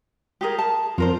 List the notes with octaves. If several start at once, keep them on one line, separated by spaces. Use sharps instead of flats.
G4 G#4 A#4
A5
F2 F4 A#4 C5